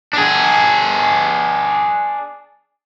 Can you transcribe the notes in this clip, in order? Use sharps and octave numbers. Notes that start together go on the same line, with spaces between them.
D4 G#4